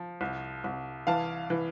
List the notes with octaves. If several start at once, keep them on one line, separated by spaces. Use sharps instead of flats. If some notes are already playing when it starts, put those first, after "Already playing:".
Already playing: F3
C2
C2
E3 F5 A5
E3